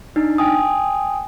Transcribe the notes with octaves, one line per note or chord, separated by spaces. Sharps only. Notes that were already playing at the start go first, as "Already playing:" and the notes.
D4 D#4
G5 G#5 D#6